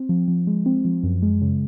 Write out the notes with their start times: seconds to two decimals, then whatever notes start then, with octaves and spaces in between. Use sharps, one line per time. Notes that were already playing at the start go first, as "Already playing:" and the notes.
Already playing: C4
0.09 F3
0.28 F3
0.47 G#3
0.66 C4
0.85 F3
1.03 F#2
1.22 G#3
1.42 C#3